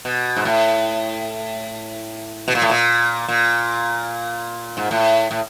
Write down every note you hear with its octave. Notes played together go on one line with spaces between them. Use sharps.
B2
G#2
A2
B2
A#2
A2
A#2
A#2
G#2
A2
A2